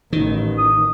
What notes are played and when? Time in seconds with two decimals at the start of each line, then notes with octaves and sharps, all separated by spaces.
0.13 A1 D#3
0.58 D#6